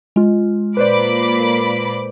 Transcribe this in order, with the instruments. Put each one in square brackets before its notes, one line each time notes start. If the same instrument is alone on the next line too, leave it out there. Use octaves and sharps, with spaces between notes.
[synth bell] G#3 F4
[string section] A#2 B5 D6 [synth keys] B4 C5 D5